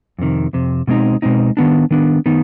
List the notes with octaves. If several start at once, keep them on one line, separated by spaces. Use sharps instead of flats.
F2 C3 D#3
F2 C3
B2 G#3 C4 D#4
B2 G#3 C4 D#4
D#3 B3 D4
D#3 B3 D4
D#3 B3 D#4